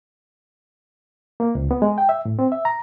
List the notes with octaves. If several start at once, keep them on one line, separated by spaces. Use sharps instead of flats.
A#3
C#2
B3
G#3
G5
E5
A2
C4
E5
A#5